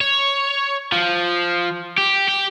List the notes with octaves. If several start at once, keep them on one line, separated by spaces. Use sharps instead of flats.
C#5
F3
G4
G4